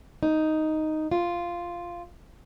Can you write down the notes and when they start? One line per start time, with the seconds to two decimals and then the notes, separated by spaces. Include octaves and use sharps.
0.23 D#4
1.11 F4